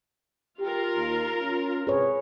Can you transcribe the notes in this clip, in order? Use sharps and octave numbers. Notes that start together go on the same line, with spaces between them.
F4 G4 A#4
D#2
C#4
C3 G#4 B4 C#5